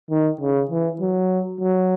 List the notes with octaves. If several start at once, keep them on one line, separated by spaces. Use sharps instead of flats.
D#3
C#3
E3
F#3
F#3